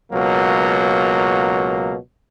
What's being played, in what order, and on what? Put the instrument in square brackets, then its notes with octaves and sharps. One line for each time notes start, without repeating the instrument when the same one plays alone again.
[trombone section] C#2 B2 F#3 A#3